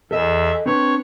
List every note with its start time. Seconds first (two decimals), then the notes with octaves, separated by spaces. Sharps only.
0.11 E2 A4 D#5 E5
0.66 C4 D4 B4 C#5